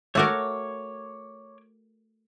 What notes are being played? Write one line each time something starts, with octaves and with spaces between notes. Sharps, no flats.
A3 F#4 A#4 C#5 D6